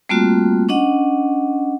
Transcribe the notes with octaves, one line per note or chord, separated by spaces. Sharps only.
G3 A3 A#3 C4 F4 F#4
C#4 D4 D#5 F#5